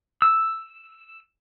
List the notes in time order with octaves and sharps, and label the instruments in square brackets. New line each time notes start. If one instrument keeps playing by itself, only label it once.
[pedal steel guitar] E6